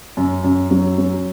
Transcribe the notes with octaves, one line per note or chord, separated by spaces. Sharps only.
F#2
F#2
F#3
F#3